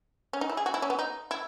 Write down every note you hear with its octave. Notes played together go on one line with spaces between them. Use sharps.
C#4
D#4
E4
G#4
F#4
E4
C#4
B3
D#4
E4